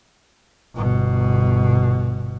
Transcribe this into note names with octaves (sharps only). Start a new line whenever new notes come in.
G1 B2